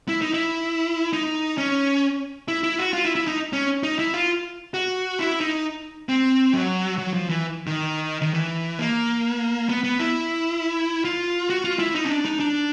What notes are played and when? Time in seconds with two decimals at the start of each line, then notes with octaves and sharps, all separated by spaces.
0.08 E4
0.21 D#4
0.34 E4
1.13 D#4
1.58 C#4
2.48 E4
2.63 E4
2.78 F#4
2.93 F4
3.05 E4
3.15 E4
3.27 D#4
3.53 C#4
3.83 D#4
3.99 E4
4.14 F4
4.74 F#4
5.19 E4
5.40 D#4
6.09 C4
6.53 F#3
6.98 F#3
7.13 F3
7.29 E3
7.67 D#3
8.22 D#3
8.34 E3
8.79 A#3
9.69 B3
9.84 B3
9.99 E4
11.05 F4
11.50 F#4
11.64 F4
11.79 E4
11.95 D#4
12.05 C#4
12.09 D4
12.25 D#4
12.40 D4